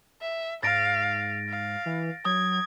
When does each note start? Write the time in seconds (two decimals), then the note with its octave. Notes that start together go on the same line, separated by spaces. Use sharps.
0.21 E5
0.63 G#2 F5 A6 A#6 D7
1.49 F5
1.86 E3
2.25 F#3 D#6 G#6